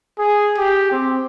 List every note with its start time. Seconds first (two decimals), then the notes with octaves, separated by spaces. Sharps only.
0.19 G#4
0.58 G4
0.91 C4